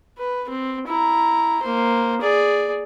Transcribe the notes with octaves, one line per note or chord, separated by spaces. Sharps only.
B4
C4
E4 A#5
A#3 C5
G#4 D5